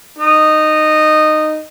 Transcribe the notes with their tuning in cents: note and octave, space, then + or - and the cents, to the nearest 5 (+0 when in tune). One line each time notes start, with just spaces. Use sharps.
D#4 -15